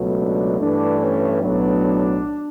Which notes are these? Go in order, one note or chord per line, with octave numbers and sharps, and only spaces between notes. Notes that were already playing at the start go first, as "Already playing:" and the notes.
Already playing: C#2 B2 F#3 A3
D4
G2 E3 A3 D4
C#4
B1 A2 F#3 B3 D4